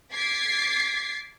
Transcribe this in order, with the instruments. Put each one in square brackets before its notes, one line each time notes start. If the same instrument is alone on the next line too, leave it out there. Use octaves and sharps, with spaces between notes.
[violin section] D6 G#6 A6 B6 C7